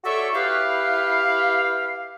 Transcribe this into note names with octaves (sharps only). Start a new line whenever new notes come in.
F#4 A4 C#5 D5 E5 C#6
E4 G4 B4 F5